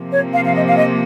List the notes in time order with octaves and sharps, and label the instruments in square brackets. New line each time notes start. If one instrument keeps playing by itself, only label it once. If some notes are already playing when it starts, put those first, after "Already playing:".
Already playing: [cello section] C3 F3 A#3
[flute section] C#5
F5
F5
D#5
F5
D#5